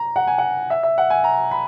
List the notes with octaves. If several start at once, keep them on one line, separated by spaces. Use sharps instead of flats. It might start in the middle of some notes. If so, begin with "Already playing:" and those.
Already playing: A#5
F#5
G#5
F#5
E5
E5
F#5
G#5
A#5
B5